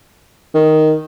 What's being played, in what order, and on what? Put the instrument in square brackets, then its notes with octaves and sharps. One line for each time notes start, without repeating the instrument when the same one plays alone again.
[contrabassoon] D#3